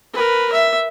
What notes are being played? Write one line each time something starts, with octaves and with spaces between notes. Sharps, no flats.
A#4 B4
E5